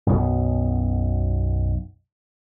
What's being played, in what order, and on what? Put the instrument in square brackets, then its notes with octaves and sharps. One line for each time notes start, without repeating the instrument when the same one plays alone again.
[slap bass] B1 F#2 B2 B3